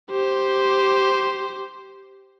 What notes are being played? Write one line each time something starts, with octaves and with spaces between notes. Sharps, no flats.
G4 C5